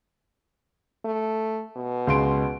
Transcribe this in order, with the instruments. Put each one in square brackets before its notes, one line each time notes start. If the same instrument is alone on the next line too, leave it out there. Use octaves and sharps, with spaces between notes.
[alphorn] A3
B2
[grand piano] C#2 C6 D7